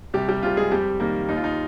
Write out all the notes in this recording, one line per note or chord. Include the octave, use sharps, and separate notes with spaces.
C2 G3 G4
G3 G4
C3 G3 F4
G#3 G#4
F2 G3 G4
D#3 G3 A#3
D#2 D#4
F4
D#4